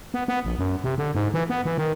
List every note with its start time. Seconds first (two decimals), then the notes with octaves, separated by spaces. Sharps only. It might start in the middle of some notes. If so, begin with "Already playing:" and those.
0.14 B3
0.28 B3
0.45 A#1
0.59 F#2
0.84 C3
0.98 D3
1.15 G#2
1.34 E3
1.50 B3
1.65 E3
1.78 D#3